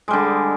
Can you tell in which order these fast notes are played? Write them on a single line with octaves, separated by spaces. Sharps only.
G#3 G3 D3